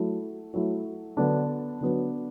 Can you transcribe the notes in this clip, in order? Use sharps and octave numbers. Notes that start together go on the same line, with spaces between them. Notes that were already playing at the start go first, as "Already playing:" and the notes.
Already playing: F#3 A3 E4
F#3 A3 E4
D3 F#3 B3 D4
D3 F#3 B3 D4